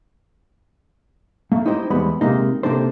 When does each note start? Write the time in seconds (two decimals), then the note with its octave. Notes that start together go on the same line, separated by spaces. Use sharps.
1.52 A3 A#3
1.66 D#4 E4 G4 C5 D#5
1.90 E2 G3 G#3 B3 B5
2.21 C3 G#3 A#3 D#4
2.63 C3 A#3 D4 D#4 A4 C5